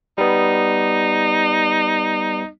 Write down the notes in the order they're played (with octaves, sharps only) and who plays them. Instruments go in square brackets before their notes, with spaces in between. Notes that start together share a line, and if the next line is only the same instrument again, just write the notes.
[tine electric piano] G3 B3 [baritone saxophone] D#4